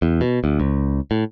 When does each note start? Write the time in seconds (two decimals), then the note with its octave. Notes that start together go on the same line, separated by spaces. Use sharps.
0.02 E2
0.21 B2
0.44 D2
0.60 C#2
1.11 A2